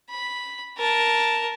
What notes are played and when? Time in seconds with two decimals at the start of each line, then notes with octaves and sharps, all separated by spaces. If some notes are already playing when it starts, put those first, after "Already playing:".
0.10 B5
0.78 A#4 A5